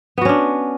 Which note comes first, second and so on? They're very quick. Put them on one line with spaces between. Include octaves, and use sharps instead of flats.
B3 F#4 C#4 D4